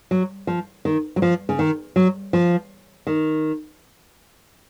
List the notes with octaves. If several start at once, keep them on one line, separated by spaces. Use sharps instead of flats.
F#3
F3
D#3
F#3
F3
C#3
D#3
F#3
F3
D#3